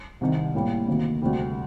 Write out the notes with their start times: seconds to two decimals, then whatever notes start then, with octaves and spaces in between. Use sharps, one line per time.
0.21 C2 C3 D#3
0.54 A2 G3 A#3
0.88 D2 C3 D#3 A#3
1.22 D2 C3 G3